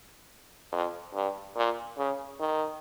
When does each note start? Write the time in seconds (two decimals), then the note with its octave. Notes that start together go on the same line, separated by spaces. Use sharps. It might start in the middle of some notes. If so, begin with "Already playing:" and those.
0.72 F2
1.14 G2
1.56 A#2
1.98 C#3
2.40 D#3